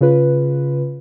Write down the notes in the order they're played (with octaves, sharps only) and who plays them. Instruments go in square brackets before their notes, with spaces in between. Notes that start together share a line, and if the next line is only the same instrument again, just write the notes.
[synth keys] C#3 F4 B4